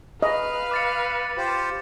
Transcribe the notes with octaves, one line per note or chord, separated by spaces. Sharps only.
B4 D#5 F5 F6
D6 A6 C#7
F4 G4 C5